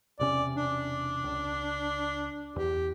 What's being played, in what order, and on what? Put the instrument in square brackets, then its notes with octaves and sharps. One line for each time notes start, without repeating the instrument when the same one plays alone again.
[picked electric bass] E1 C3 C#4 [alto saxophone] D5
[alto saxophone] D4
[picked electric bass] C#2
[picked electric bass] E2 [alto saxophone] G4